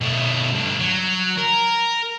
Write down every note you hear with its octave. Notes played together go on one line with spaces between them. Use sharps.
B2 A3
G2 D3
F#3
A#4